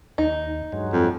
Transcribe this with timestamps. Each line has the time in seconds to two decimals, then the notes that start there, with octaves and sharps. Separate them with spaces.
0.18 D#2 D#4
0.72 G2 F#3 G#3
0.93 F2